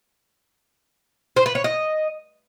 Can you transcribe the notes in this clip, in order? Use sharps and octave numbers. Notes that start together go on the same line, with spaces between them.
C5
B4
C#5
D#5